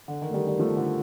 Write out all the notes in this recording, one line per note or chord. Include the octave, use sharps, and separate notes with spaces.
D3
D#3
A3
D#3 G3
D#3 G3
F3 A3
D3